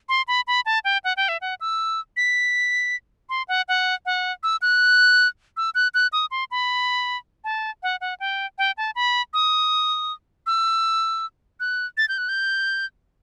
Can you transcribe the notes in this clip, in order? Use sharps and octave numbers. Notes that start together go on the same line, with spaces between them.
C6
B5
B5
A5
G5
F#5
G5
E5
F#5
E6
B6
C6
F#5
F#5
F#5
E6
F#6
E6
F#6
F#6
D#6
C6
B5
A5
F#5
F#5
G5
G5
A5
B5
D#6
E6
F#6
A6
G6
F#6
G6